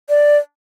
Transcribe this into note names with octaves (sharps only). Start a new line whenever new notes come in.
D5